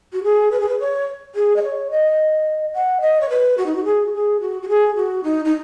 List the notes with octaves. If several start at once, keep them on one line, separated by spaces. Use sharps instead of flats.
F#4
G#4
B4
G#4
B4
C#5
G#4
D#5
C#5
D#5
F#5
D#5
C#5
B4
F#4
D#4
F#4
G#4
F#4
G#4
F#4
F#4
G#4
F#4
D#4
D#4